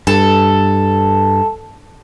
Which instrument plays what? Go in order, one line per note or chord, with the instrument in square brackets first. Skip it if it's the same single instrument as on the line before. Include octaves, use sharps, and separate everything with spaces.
[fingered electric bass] G2 [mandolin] A4